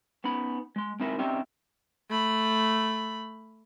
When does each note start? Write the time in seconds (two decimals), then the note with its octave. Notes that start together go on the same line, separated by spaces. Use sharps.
0.24 B3 C#4 D#4 B5
0.76 G#3 C6
1.00 G#3 C4 D#4 E4 A#4 E5
1.19 C4 C#4 D#4 G4 D5 E5
2.10 A3 B5